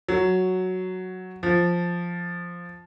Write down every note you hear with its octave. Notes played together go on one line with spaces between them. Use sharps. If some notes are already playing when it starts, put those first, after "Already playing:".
F#3
F3